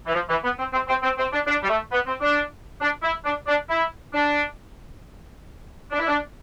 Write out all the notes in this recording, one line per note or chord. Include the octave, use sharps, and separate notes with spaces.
E3
F3
E3
B3
C4
C4
C4
C4
C4
D4
D4
G3
A3
B3
C4
D4
D4
E4
D4
D4
E4
D4
D4
E4
D4